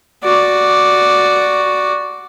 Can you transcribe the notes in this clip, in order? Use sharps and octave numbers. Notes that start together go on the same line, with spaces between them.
F#4 D5